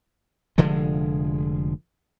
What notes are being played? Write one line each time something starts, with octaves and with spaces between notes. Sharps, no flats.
F1 D3 F3 G#3